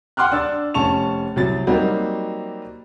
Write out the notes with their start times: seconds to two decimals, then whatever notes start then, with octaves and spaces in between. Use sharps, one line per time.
0.17 F#5 G5 C6 D6 F6 F#6
0.32 D4 E6 A6
0.74 F1 C#4 A5 C#6 F7
1.36 C2 F#3 A6
1.67 F#3 G3 A#3 C4 D#4 F#4